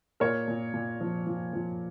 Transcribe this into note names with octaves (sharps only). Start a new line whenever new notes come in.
A#2 A#4 C#5
A#2
A#2
F3
F3
F3